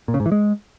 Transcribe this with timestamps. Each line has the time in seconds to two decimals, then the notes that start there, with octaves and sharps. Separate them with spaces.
0.08 A#2
0.14 C#3
0.20 G#2
0.26 E3
0.32 G#3